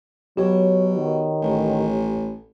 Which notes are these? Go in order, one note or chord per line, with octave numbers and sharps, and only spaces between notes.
B2 F#3 G4 C#5
D#3
A1